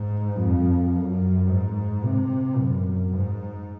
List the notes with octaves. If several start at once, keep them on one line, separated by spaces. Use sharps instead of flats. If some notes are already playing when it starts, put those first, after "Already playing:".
Already playing: G#2
F2
F#2
G#2
C3
F#2
G#2